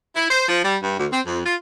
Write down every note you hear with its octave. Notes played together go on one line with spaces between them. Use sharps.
E4
C5
F3
G3
G2
D2
C4
F2
F4